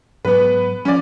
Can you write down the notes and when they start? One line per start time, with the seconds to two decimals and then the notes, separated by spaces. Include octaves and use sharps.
0.25 G#2 F#3 B3 B4
0.85 F3 F#3 C#4 D5